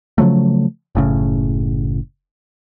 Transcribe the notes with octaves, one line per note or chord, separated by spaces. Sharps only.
C#3 F3 F#3 A3
F#1 A2 C#3